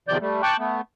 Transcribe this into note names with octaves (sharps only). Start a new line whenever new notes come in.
E2 C3 D#3 F3 D5 G6
G3 A3
G5 A5 C#6 D6 F#6
A3 B3